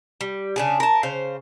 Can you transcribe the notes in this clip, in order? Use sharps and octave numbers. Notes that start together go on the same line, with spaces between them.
G3
C#3 D4 G#4
A#4 A5
C#3 C5 F5